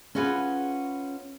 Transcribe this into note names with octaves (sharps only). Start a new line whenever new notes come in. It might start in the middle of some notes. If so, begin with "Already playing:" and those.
C#4 F4 F#4 G#4 B4